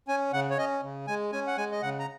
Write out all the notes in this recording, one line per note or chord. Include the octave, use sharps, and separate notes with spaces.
C#4 G#5
C#3 F#5
C#5
C#4 D#5
C#3
G#3 G#5
C#4 G#5
F#5
G#3 G#5
D#5
C#3 F#5
A#5